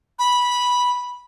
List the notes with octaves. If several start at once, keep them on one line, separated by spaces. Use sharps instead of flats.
B5